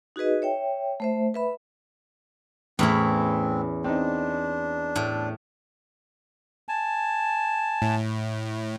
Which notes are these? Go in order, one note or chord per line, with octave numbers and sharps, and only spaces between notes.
D#4 F#4 G#4 B4 D#5
C#5 E5 G5
A3 C5 E5
B4 E5 B5
E2 A2 C4 C#4 E4
C4 D4 D#4
A2
G#5 A5
A2